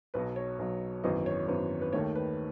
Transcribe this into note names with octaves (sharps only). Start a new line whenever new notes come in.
B1 B2 F#3 B4
C#5
B1 B2 F#3
G#1 F#2 E3 B3 D#5
C#5
G#1 F#2 E3 B3
B4
D#2 D#3 A3 C#5
B4